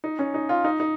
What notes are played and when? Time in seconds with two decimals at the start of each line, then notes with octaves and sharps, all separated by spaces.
0.04 D#4
0.19 C#4
0.34 D#4
0.49 F4
0.64 D#4
0.80 D#4